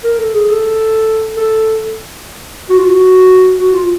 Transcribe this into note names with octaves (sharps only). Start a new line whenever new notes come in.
A#4
A4
G#4
A4
A4
F#4
F4
F#4
F#4
F4